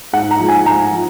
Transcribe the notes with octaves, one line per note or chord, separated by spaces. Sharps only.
G#2 F#5
A#5
F3 G#3
G#5
G#2 A#5
F3